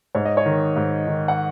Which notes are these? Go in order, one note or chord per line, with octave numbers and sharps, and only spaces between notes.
G#2 C#5
D#5
C#5
D#3
G#2
D#3
F#5